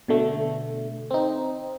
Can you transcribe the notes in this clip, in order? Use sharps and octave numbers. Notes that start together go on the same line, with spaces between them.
B2 D3 A3
C4 D#4